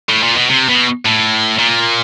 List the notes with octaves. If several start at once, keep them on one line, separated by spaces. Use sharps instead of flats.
A2
A#2
B2
C3
B2
A2
A#2